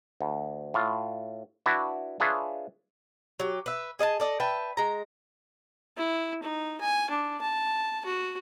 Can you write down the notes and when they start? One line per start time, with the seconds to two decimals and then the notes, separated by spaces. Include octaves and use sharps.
0.21 D2
0.74 A2 F4
1.66 D4 E4 F#4 B4
2.20 D4 F4 G#4 B4 C#5 E5
3.40 F#3 G4
3.66 B4 E5
3.99 G#4 D#5 F5 A5
4.20 A4 D5 D#5
4.40 B4 E5 G5 A5
4.77 G#3 A#5
5.97 E4
6.43 D#4
6.81 G#5
7.10 D4
7.41 A5
8.05 F#4